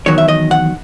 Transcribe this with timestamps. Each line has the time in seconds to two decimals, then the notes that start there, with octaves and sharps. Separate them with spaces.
0.06 E2 D#3 F#3 C#5
0.18 E5
0.28 D#5
0.51 F#5